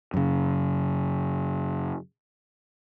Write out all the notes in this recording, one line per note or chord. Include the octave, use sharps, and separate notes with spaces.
F#2 C#3